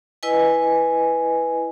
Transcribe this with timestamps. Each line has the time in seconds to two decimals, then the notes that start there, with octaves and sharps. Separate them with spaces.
0.23 E4 B4 D#5 G#5